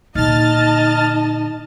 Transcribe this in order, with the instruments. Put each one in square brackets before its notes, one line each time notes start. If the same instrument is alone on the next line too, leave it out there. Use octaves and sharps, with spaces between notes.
[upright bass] A#2 D3 [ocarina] D#4 [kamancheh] D#5 A5 [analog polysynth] F6 A6